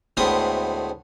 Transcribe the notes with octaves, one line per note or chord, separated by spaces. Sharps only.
D2 A2 G#3 B3 C4 D#6